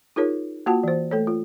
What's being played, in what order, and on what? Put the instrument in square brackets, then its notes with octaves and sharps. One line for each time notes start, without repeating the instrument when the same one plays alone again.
[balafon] D#4 F4 G#4 A#4 C#5
A#3 F4 F#4 F#5 A5
E3 C5
A3 A4 C#5
F4